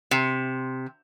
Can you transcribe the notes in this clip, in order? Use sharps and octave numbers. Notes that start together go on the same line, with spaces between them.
C3